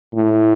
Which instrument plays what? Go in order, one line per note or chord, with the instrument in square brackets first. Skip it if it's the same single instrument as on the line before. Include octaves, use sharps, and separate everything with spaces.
[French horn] A2